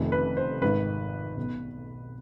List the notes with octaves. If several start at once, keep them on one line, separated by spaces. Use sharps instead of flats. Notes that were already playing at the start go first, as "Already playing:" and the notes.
Already playing: F1 F2 C3 D#3
B4
C5
G#1 G#2 D#3 B4
B1 B2